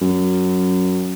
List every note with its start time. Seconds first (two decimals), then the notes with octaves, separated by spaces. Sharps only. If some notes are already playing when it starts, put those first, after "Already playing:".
0.01 F#2